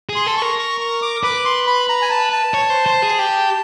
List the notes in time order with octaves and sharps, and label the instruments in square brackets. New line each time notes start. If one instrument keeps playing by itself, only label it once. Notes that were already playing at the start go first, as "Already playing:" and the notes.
[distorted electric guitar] G#4
[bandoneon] C6
[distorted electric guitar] A4
[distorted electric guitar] A#4 [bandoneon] C#6
[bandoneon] C#6
C#6
D6
[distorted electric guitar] B4 [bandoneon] D6
[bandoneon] C6
B5
A#5
G#5
A5
A5
[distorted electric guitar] C#5
C5
C5
G#4
G4